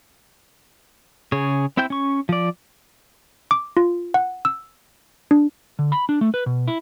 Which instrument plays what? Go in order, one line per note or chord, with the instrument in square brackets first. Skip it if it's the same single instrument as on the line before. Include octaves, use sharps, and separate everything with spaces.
[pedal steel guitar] C#3 G#4 C#5
C4 E4 C5 G5 G6
C#4 C#6
F3 D5
[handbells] D6
F4
F#5
E6
D4
[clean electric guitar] D3
B5
D4
A3
B4
B2
E4